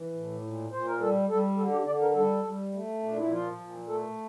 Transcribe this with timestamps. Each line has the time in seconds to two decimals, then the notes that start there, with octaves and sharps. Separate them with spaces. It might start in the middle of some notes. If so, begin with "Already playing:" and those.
Already playing: E3
0.14 A2
0.42 A#2
0.71 A#2 C5
0.86 A#4
1.00 G3 A4
1.29 G3 A4
1.57 D3 A4
1.72 G4
1.86 D3 D5
2.01 A#4
2.15 G3 A4
2.43 G3
2.73 A3
3.02 A#2 D4
3.17 E4
3.30 F3 F4
3.59 A#2
3.88 A3 A4